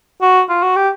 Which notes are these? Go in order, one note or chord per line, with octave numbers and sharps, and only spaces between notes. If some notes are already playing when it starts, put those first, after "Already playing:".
F#4
F4
F#4
G4